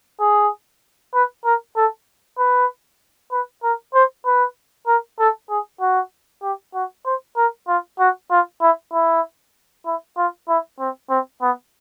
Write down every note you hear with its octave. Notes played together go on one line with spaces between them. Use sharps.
G#4
B4
A#4
A4
B4
B4
A#4
C5
B4
A#4
A4
G#4
F#4
G4
F#4
C5
A#4
F4
F#4
F4
E4
E4
E4
F4
E4
C4
C4
B3